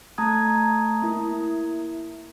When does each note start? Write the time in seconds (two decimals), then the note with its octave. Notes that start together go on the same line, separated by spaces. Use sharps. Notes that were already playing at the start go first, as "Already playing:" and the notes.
0.18 A3 A5 A#5 D#6 G#6
1.02 A#3 E4